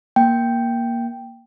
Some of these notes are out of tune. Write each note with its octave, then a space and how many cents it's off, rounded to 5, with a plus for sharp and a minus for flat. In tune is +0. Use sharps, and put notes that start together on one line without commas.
A#3 +10 G5 +0